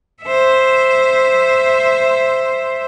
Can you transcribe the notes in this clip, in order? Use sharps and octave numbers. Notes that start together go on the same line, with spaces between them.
C5 E5